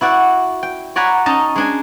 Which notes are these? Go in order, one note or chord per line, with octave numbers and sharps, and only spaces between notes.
E4 F#4 D5 F#5
G5
C#5 D5 F#5 G#5 A#5 B5
C#4 D#4 D#5 A5 A#5
G#3 D4 G#5